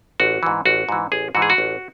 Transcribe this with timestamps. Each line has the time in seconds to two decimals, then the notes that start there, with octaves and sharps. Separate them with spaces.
0.20 A1 F#4
0.43 G#2 E3
0.65 A1 F#4
0.89 G#2 E3
1.12 A1 G#4
1.35 G#2 E3 F#4
1.42 G#4
1.50 F#4
1.58 A1